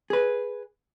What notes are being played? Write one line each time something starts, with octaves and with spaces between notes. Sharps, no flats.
G#4 B4